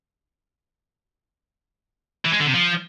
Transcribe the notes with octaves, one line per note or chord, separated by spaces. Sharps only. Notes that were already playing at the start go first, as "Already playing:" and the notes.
E3
G#3
D3
C3
F3